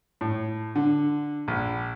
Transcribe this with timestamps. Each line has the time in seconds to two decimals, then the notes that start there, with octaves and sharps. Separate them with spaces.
0.21 A2
0.75 D3
1.48 A#1